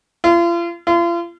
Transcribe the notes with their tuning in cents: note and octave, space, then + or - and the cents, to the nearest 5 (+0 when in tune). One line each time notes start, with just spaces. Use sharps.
F4 -40
F4 -40